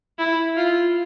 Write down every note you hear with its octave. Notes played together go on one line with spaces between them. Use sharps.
E4
F4